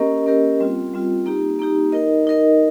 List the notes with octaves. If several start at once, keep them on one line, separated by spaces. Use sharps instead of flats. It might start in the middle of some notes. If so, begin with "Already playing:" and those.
Already playing: A#3 C#4 G4 A#4 D#5
A#3 C#4 G4 A#4 D#5
G3 C4 F4
G3 C4 F4
A#3 D#4 G4
A#3 D#4 G4
D#4 A#4 D#5
D#4 A#4 D#5